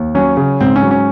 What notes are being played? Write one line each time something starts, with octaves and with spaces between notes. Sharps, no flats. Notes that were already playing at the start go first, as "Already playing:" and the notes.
Already playing: D#2
F#3 C#4
C#3
G#2 C4
C#4
F#3
C#4